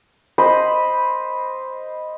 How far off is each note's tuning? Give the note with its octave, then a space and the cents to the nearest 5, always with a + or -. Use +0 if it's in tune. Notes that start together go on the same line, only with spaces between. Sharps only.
C5 +0 D#5 +0 B5 -5